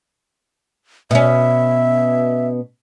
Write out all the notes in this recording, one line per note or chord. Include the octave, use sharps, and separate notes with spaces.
B2 C#4 E5